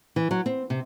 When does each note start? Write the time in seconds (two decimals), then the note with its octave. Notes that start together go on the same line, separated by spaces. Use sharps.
0.16 E3
0.31 F#3
0.46 C4
0.70 C3